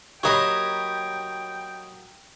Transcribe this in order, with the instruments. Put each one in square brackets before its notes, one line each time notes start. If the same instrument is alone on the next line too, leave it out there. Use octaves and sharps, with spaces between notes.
[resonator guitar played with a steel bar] F#3 A#3 G4 [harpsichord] C#5 D#5 B5 [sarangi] G5